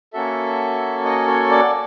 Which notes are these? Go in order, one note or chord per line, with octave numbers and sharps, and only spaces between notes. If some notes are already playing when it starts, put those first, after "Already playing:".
A#3 C#4 F#4 A4 E5
D#5
C#5
D5